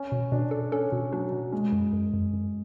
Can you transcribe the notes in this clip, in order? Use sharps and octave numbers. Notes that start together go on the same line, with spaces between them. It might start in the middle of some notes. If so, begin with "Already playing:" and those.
Already playing: C#4
B2
B2 D4
A4
C#4 A4
B2
F#3 D4
B2
G#3 C#4
F#2
F#2
F#2
F#2